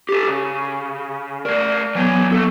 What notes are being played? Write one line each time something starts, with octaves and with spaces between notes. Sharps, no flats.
G4 A4
C#3
A3 A#4 D5
E3 F#3 B3 C#5
A#3 A4